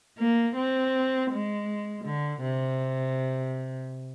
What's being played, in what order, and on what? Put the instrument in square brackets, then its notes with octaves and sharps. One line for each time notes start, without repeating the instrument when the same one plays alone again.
[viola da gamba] A#3
C4
G#3
D3
C3